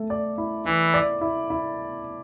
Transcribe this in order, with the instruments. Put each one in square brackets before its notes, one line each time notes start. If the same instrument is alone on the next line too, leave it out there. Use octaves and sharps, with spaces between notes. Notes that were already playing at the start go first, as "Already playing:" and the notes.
Already playing: [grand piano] A3 A4
D5
E4
[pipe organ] E3 [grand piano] E4
[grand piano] D5
E4
E4